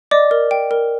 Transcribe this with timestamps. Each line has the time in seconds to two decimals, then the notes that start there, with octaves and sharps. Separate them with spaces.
0.11 D5 D#5 D6
0.31 A#4
0.51 G5
0.71 A#4